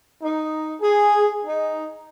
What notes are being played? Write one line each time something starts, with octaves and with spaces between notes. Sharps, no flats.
D#4
G#4
D#4